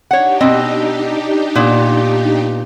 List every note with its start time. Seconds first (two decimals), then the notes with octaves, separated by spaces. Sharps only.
0.11 D4 D#4 G4 C#5 F#5
0.41 B2 C4 D#5
1.55 A#2 B3